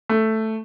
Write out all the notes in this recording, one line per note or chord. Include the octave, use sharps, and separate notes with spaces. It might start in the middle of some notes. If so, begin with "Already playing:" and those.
A3